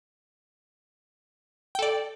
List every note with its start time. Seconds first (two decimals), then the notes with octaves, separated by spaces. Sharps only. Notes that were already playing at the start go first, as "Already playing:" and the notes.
1.75 G5
1.79 A4
1.82 D5